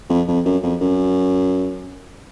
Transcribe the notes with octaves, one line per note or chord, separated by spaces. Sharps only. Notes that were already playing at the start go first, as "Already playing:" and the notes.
F2
F2
F#2
F2
F#2